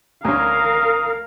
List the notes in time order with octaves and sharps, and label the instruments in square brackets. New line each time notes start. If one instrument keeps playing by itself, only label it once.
[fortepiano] D2 C#4 [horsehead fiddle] A#4 F5 [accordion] A#5 D#6